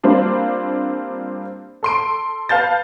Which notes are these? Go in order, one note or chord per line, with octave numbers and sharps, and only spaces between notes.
G3 A#3 C4 D4 F4
A4 C6 D7
B4 F5 A5 G6 A6